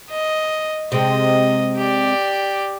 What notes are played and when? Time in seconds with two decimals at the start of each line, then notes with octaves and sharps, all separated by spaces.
0.10 D#5
0.92 C3 G#3 D#5
1.76 G4 D5